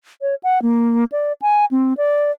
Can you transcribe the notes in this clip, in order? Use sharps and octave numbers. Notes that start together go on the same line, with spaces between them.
C#5
F#5
A#3
D5
G#5
C4
D5